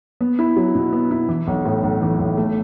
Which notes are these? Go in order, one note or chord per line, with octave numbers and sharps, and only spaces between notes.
B3
E4
F#3
B2
B3
E4
E3
B1
A2
B1
E3
B1
A3